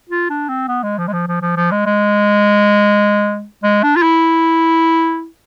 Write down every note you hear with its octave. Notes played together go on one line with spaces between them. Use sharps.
F4
D4
C4
B3
G#3
F3
G#3
F3
F3
F3
F3
G#3
G#3
G#3
D4
F4
E4